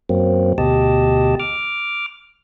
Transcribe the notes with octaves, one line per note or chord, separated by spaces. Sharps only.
F#2 F#3 A#3 C4
D2 B2 G4 D#5 A5
D6 F6